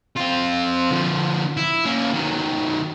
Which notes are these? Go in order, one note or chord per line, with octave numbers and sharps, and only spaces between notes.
C4 F4
D3 F3
E4
A#3 C#4
D#3 F#3